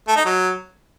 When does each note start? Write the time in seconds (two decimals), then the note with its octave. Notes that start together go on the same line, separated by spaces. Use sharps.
0.08 A3
0.17 D#4
0.25 F#3